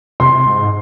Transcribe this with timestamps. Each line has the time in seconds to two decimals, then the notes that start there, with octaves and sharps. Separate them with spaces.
0.20 C3 C6
0.46 G#2